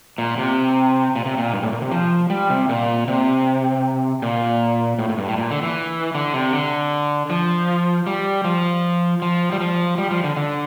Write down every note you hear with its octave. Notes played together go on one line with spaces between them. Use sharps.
A#2
C3
A#2
C3
A#2
G2
A2
A#2
C3
F3
G3
C3
A#2
C3
A#2
A2
A2
G2
A2
A#2
D3
E3
D3
C3
D3
F3
G3
F3
F3
G3
F3
G3
F3
D3
D3